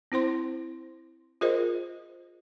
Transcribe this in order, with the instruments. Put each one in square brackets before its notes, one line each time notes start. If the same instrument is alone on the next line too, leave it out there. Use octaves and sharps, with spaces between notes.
[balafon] C4 E4 C5 C6
F4 G#4 A#4 C5 D#5